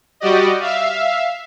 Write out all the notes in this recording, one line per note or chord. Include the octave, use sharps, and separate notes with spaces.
G3 F#4 G4 D5 D#5
E5 F5